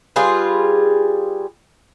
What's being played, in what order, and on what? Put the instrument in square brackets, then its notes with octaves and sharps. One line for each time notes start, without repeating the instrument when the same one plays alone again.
[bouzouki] G3 F4 G#4 B4